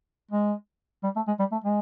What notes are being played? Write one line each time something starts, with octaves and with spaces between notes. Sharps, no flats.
G#3
G3
A3
G#3
G3
A3
G#3